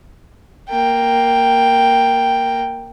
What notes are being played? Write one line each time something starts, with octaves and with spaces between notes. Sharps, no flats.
A#3 G5